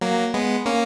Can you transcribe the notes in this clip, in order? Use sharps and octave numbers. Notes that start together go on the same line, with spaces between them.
F#3 A#3
G#3 B3
A#3 C#4